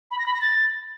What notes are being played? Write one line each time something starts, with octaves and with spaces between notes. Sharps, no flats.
B5
A#6
B5
A#6
A6